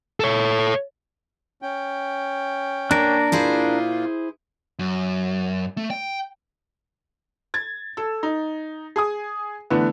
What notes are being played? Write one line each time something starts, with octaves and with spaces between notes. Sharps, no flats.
A4 C#5
C#4 G5
A#3 D4 A#4
A#2 E4 F4 G#4 C5
F#2
A3
G5
G#6 A6
A4 E6
D#4
G#4 G#5 D#6
D3 E3 A3 B3